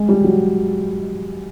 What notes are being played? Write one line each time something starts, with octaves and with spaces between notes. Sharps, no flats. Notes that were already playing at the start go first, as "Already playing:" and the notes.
Already playing: G#3
G3
F#3